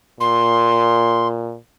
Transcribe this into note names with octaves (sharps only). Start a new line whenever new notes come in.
A#2 C6